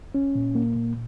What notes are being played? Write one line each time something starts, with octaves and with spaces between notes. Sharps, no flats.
C#4
A#2
A#3
A#2